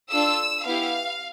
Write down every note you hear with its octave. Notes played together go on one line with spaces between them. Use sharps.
D4 F4 A4 E6
B3 E4 G4 F5